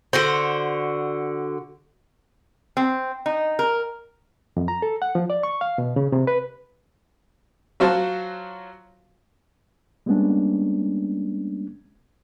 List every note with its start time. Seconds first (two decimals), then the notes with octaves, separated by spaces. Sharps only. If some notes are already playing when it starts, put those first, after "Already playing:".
0.13 D3 F#4 C5
2.77 C4
3.26 D#4
3.59 A#4
4.57 F2
4.68 A#5
4.82 A4
5.02 F#5
5.15 F3
5.30 D5
5.43 C#6
5.61 F5
5.78 B2
5.96 C#3
6.12 C3
6.27 B4
7.80 F#3 F4 F#4 C5 F5 A5
10.06 G3 G#3 A#3 B3 C#4 D4